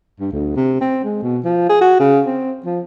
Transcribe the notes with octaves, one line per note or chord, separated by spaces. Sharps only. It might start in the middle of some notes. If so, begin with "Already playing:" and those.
G2
D2
C3
C4
G#3
B2
F3
G#4
F#4
C#3
C4
F3